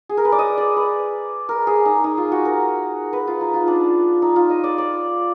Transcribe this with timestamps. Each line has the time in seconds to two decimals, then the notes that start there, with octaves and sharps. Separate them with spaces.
0.09 G#4
0.17 A#4
0.25 B4
0.32 D5
0.39 D#5
0.58 D5
0.76 B4
1.49 A#4
1.67 G#4
1.86 D#4
2.04 D#4
2.18 F4
2.32 F#4
2.45 A#4
3.13 B4
3.27 F4
3.41 D#4
3.54 F4
3.68 D4
4.22 D#4
4.36 F4
4.50 D#5
4.64 D5
4.78 D5